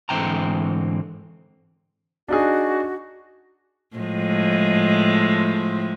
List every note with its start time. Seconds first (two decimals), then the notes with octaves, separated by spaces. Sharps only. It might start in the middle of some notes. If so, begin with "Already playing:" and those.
0.09 G#2 D3 E3 C4 G5 A#5
2.28 D4 D#4 F#4 G#4
3.96 A2 F3 G#3